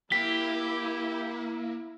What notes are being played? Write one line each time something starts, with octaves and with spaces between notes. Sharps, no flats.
A#3 E4 G4 B6